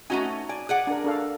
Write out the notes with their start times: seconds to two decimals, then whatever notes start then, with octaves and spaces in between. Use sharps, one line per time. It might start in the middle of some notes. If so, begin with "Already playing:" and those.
0.10 A3 C#4 D#4 F#4 G#5
0.49 D5 G#5
0.69 G#4 D5 F#5
0.87 D4 A#4
1.04 D4 A4 F5